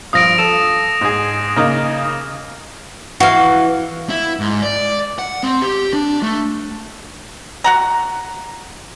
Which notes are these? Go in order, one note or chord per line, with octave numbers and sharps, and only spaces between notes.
G2 F3 F5 D#6 A#6 D7
A4 E7
G#2 G#4
C#3 A#3 D#4
E3 F#4 F5
E4
G#2
D5
F#5
C4
G4
D4
A3
F#4 F#5 A#5